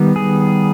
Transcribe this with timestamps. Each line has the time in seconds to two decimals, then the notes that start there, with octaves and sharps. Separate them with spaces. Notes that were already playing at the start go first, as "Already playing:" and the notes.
Already playing: D#3 G3 B3
0.16 G#4